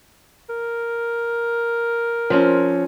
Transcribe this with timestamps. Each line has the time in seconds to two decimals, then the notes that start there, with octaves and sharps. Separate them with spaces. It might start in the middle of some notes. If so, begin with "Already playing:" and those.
0.49 A#4
2.30 F3 C4 C#4